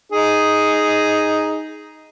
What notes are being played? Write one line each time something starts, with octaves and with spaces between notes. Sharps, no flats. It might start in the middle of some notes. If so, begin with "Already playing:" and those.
D#4 G#4